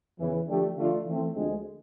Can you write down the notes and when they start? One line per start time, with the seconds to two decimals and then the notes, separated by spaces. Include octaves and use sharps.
0.18 E2 C#3 E3
0.47 D3 F3 A3 D4 G4
0.76 D3 F3 A3 D4 F4
1.06 E3 A3 C4
1.35 D2 D3 F3 G#3